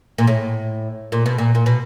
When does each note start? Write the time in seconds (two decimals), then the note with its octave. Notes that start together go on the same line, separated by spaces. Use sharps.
0.18 A#2
0.27 A2
1.12 A#2
1.26 B2
1.38 A#2
1.55 A#2
1.66 B2